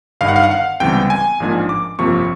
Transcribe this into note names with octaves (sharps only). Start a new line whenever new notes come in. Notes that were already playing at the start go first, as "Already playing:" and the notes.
G1 G2 D#3 F5
F#5
F5
F#5
F5
C#2 C3 E3 G3 B3 G5
G#5
A1 G#2 F3 A#3 D4
D6
G1 F2 C3 F3 A#3 C#6